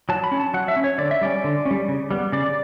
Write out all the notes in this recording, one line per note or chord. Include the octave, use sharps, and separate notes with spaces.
F#3 A5
B5
C#4
A5
F#3 F#5
E5
C#4
C#5
D3 D5
E5
G3 C#4 D5
D3
C#4
G3
C#3
G3 B3
C#3 D5